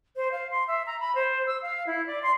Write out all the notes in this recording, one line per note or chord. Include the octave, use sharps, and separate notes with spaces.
C5
F5
C6
E5
A#5
B5
C5
E6
F5
E4
D5
C6